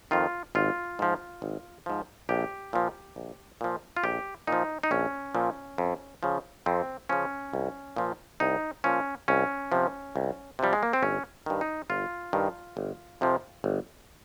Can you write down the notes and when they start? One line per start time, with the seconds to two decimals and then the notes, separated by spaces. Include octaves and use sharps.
0.11 F2 D#3 F4
0.55 G#1 F4
0.99 G#2 F3
1.42 G#1
1.86 G#2 F3
2.29 A#1 G4
2.73 A#2 F3
3.16 A#1
3.61 A#2 F3
3.97 F4
4.04 A#1 G4
4.47 A#2 F3 D#4
4.83 D#4
4.91 A#1 C#4
5.35 A#2 F3
5.78 F2
6.23 C#3 F3
6.66 F2 C4
7.09 C#3 F3 C#4
7.53 C2
7.96 A#2 F3
8.40 C2 D#4
8.84 A#2 F3 C#4
9.28 C2 C#4
9.72 C3 F3
10.16 C2
10.59 C3 F3 G3
10.73 G#3
10.83 A#3
10.93 C4
11.03 G1 C#4
11.46 G2 D#3
11.61 D#4
11.90 G1 F4
12.33 G2 D#3
12.77 G1
13.21 F2 C3 F3
13.64 G1